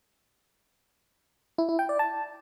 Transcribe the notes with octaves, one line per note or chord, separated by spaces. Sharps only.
E4
E4
G5
D5
A5